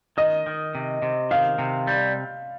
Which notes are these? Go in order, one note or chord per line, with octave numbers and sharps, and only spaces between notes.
D#3 D#5
D#3
C3
C3
D#3 F5
C3
G3